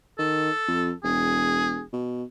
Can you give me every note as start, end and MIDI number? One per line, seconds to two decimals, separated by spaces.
0.19 0.50 51
0.19 0.93 69
0.67 0.92 41
1.04 1.82 28
1.04 1.83 68
1.93 2.24 47